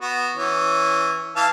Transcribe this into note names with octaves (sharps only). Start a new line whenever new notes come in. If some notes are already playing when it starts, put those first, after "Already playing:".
B3 F#4
E3 C#4
E3 F5 A5